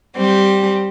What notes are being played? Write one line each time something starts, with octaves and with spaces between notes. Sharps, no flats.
G3 C4 G4